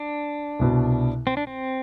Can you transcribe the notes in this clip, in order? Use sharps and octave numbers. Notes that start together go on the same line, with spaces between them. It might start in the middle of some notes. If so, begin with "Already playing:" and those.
Already playing: D4
C2 B2 B3
C4
D4
C4